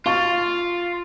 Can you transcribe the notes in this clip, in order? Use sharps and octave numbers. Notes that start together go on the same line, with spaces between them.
F4 F5 C#6 A6